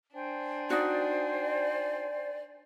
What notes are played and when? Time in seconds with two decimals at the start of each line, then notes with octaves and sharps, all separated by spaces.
0.14 D4 C5 G5 G#5
0.70 D#4 F#4 D5